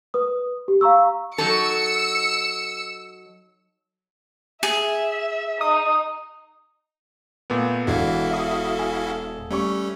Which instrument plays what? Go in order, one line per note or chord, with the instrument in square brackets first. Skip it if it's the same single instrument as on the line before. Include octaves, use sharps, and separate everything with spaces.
[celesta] B4 D#6
G4
F5 A#5 C#6 E6
[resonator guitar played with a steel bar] F#3 D#4 A4 [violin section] E6 C#7
[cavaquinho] G#4 [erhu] E5
[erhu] D#4 [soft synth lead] D#6
[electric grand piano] A#2 A3 B3
[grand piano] E1 [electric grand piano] E3 D4 [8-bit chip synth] E4 F#4 F5 [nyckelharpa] A4
[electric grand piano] E5 D#6
G#5
[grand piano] G3 C#6 [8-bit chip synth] A3 C#4